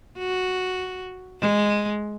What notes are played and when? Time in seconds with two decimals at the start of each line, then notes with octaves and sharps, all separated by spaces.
0.18 F#4
1.41 G#3